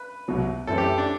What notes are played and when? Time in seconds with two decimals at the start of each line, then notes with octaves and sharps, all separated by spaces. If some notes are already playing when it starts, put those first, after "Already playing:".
Already playing: B4
0.28 C2 B2 F#3
0.67 F#2 E3 A3 C4 A4
0.78 G4
0.98 D4